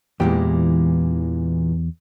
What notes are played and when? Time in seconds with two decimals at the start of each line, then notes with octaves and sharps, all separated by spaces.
0.20 E2 A#2 E3 G#3 G4